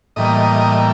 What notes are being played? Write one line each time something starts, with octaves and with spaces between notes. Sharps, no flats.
A2 E3 G3 A#3 D#5